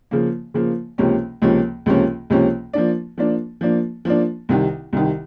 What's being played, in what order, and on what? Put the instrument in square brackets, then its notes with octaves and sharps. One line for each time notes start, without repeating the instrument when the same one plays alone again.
[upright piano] C#3 F3 A#3
C#3 F3 A#3
C#2 C3 F3 A#3 C#4
C#2 C3 F3 A#3 C#4
C#2 C3 F3 A#3 C#4
C#2 C3 F3 A#3 C#4
F3 A#3 D4
F3 A#3 D4
F3 A#3 D4
F3 A#3 D4
C2 C3 D#3
C2 C3 D#3